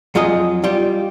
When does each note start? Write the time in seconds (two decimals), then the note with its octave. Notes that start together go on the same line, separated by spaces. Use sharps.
0.15 F2 F#3 F4 G#4 D#5
0.64 G3 F4 G4